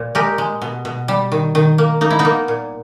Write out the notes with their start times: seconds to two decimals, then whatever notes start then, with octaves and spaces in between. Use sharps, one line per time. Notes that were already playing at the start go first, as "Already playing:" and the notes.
Already playing: A#2
0.15 G#3 G4 A#4
0.38 G#3
0.62 B2
0.85 B2
1.08 G3
1.32 D#3
1.55 D#3
1.78 A#3
2.01 A#3 D#4
2.10 E4
2.19 B3 D#4
2.25 A#3
2.48 A#2